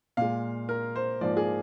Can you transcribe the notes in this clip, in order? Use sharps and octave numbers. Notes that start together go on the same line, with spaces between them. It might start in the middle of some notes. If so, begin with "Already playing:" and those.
A#2 G#3 F5
A#4
C5
G#2 F3 A#3 D5
G#4